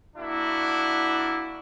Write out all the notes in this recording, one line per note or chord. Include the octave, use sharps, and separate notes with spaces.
A#3 D4 E4 F#4